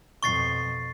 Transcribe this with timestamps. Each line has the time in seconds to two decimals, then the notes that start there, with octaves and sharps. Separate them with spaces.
0.23 F2 B2 C#6 A6 C7